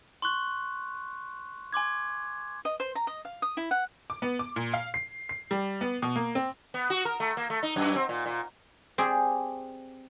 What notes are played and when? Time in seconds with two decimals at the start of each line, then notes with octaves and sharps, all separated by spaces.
0.22 C6 C#6 F#6
1.73 G#5 C6 D6 G#6
2.65 D#5
2.80 C5
2.95 A#5
3.07 D#5
3.25 F5
3.42 D#6
3.57 E4
3.71 F#5
4.10 D6
4.22 B3
4.39 D6
4.56 A#2
4.74 F5
4.94 C7
5.29 C7
5.51 G3
5.81 B3
6.02 B2
6.16 A#3
6.35 C4
6.74 B3
6.90 F#4
7.05 A#4
7.20 A3
7.37 A#3
7.50 A3
7.63 D#4
7.76 F#2
7.96 C4
8.09 A#2
8.26 A#2
8.98 C4 G4 G#4 D5